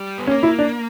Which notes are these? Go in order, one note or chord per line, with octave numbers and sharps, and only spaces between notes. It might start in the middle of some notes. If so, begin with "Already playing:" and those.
Already playing: G3
B3
A#3 C#4
E4
D4